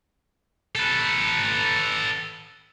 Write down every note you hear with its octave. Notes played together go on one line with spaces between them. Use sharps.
A4 B4